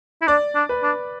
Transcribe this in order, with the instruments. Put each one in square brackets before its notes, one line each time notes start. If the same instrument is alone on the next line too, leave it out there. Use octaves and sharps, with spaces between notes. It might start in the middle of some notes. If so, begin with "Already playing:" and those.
[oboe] E4
[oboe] D4 [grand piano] D5
[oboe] D4
[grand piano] B4
[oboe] D4